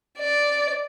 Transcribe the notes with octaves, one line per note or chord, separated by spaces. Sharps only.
D5